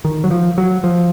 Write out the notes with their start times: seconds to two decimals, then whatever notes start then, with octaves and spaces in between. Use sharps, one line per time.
0.05 D#3
0.24 F#3
0.31 F3
0.58 F#3
0.84 F3